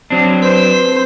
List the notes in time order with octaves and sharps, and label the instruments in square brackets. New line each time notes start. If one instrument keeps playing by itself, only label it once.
[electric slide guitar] F#3 D4 [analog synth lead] C4
[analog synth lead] C4 [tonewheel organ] B4 [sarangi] C5